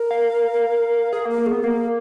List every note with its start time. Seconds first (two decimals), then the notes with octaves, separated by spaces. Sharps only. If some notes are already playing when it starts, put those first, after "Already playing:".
Already playing: A#4
0.11 F5
1.13 G#4 A#4
1.25 A#3
1.30 A#4
1.38 A#3
1.46 B3 G#4
1.64 A#3 A#4